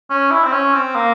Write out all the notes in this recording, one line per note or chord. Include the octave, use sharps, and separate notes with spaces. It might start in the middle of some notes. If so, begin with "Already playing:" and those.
C#4
E4
C4
C#4
C4
A#3